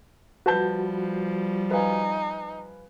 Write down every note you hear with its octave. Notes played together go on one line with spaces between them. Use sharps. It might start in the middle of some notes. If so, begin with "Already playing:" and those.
F3 G3 F#4 B4 A5 G6
D#4 B4 F5 G#5